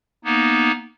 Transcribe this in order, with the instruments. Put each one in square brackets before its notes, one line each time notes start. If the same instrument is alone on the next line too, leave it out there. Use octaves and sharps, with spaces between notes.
[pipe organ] A#3 B3 D#4